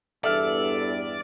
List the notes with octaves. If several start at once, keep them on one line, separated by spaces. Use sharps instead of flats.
E2 G2 A4 D5 E5 F6